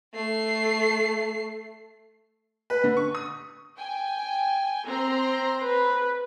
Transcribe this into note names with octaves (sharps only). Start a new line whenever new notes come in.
A3 C7
B4
D3
C#6
D#6
G5 G#5
C4 A#5 C6
B4